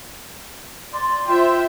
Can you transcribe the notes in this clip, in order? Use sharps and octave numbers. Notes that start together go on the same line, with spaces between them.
D5 C6
F4 C5 E5 G5